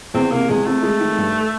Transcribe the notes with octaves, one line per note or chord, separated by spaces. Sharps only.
E2 C4
C3 A#3
E2 G#3
A3 C4
G#3
D#3
G2